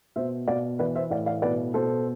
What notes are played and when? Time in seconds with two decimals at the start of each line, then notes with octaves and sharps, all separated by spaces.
0.16 B2 C5 E5
0.48 B2 D5 F5
0.79 E3 B4 D5
0.95 C5 E5
1.10 A2 D5 F5
1.26 D5 F5
1.42 B2 B4 D5
1.74 B2 A4 C5